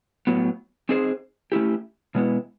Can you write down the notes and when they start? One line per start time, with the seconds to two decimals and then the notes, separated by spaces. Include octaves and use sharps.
0.27 A2 F#3 B3
0.89 C4 D#4 G#4 C5
1.52 A3 C#4 E4 G4
2.15 B2 G#3 B3 E4